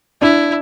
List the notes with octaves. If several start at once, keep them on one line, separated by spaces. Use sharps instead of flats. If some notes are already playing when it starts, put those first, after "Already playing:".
D4 E4